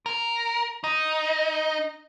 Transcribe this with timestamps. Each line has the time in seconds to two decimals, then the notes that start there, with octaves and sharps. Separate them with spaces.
0.06 A#4
0.84 D#4